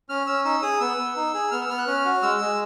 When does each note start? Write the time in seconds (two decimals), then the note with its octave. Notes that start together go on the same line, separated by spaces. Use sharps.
0.09 C#4 F6
0.27 C#4 E6
0.45 D#4 E6
0.62 G#4 D#6
0.81 B3 E6
0.98 B3
1.16 D#4
1.34 G#4
1.51 B3 F6
1.61 E6
1.69 B3 F6
1.78 F#6
1.87 C#4 F6
2.05 F#4
2.23 G#3 E6
2.41 G#3